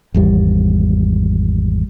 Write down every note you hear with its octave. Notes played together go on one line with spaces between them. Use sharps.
G#1 E2 G3